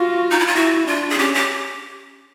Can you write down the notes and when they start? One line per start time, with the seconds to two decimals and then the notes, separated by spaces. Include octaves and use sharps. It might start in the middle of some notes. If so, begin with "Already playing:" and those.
Already playing: F4 F#4
0.31 D#4
0.39 E4
0.47 F4
0.55 E4 F#4
0.87 D4 F4
1.10 G#4
1.19 C#4 G4
1.34 G4